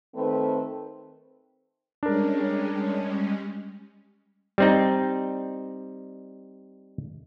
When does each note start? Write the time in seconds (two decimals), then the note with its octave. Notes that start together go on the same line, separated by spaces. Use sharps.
0.15 D#3 A3 C4 B4
2.03 G3 G#3 C#4 D4 A#4
4.58 G3 C4 D#4